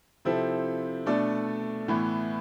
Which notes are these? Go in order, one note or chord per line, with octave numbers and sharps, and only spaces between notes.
C3 F3 C4 E4 A4
B2 A3 D4 A4 D5
A2 E3 B3